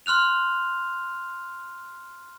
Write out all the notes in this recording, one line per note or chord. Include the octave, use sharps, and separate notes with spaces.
C6 F6 F#6 F7